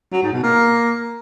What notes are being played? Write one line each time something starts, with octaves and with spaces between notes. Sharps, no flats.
F#3
G#2
B2
A#3